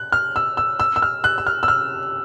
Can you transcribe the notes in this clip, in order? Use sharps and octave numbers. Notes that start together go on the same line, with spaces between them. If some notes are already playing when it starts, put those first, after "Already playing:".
Already playing: F#6
F6
E6
E6
E6
E6
F6
F#6
E6
F6
E6
F6